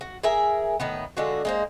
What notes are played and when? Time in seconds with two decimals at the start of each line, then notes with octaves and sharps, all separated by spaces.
0.01 F#4
0.23 G#4 A#4 E5 G#5
0.80 A2 D#3 B3
1.17 D3 G#3 F4 F#4
1.45 G#3 A#3 C5